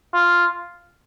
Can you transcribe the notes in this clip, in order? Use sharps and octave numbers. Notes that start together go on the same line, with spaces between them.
F4